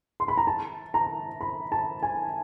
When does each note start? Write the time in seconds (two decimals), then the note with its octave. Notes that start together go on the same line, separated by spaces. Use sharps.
0.20 C6
0.28 B5
0.37 A#5
0.47 A5
0.94 A#5
1.41 B5
1.72 A5
2.03 G#5